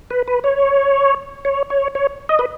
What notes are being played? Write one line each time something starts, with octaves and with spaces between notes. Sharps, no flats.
B4
B4
C#5
C#5
C#5
C#5
D#5
B4